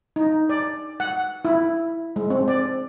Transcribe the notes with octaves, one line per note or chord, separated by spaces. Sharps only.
D#4
D5
F#5
E4
G#3
C4
D5